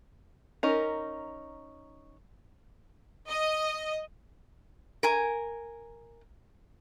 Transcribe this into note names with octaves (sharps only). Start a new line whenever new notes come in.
C#4 D#4 A#4
D#5
A#4 G#5